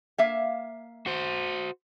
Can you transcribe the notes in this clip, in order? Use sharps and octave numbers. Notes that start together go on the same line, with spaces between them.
A#3 E5 F5
F#4 C5